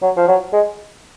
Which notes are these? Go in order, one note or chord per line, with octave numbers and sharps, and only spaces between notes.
F#3
F3
F#3
G#3